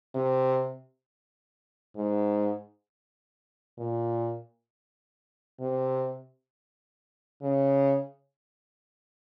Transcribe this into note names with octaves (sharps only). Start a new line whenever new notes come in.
C3
G#2
A#2
C3
C#3